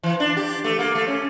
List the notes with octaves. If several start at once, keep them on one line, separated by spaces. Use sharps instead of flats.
E3
D4
G4
A3
A#3
A3
C#4